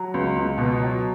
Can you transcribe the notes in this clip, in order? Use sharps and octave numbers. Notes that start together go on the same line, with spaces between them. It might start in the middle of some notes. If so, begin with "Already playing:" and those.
Already playing: F#3
C#2
C#2
B2
F#3